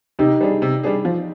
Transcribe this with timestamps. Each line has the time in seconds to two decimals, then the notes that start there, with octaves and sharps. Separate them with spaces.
0.19 C3 D#4 G4
0.41 G3 D4 G#4
0.62 C3
0.83 G3 D4 G#4
1.05 F3